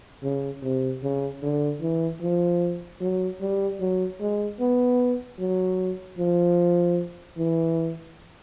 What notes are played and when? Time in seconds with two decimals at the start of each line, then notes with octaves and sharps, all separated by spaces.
0.23 C#3
0.63 C3
1.03 C#3
1.43 D3
1.81 E3
2.21 F3
3.01 F#3
3.41 G3
3.80 F#3
4.20 G#3
4.60 B3
5.39 F#3
6.18 F3
7.37 E3